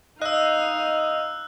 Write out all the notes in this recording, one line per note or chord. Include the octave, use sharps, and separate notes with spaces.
D#4 D#5 F5 E6 F#6